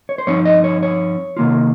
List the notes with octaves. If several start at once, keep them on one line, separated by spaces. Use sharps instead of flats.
C#5
C5
G2 F3 C4 D#4 C#5
D#5
C#5
C#5
C3 D#3 A#3 F4